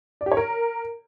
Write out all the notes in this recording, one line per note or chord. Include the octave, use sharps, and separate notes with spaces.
D5
G4
C#5
A#4